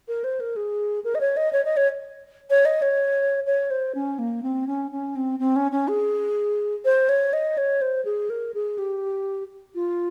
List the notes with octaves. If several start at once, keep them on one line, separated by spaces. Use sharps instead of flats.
A#4
C5
A#4
G#4
A#4
D#5
C#5
D#5
C#5
D#5
C#5
C#5
D#5
C#5
C#5
C5
C#4
A#3
C4
C#4
C#4
C4
C4
C#4
C#4
G#4
C5
C#5
D#5
C#5
C5
G#4
A#4
G#4
G4
F4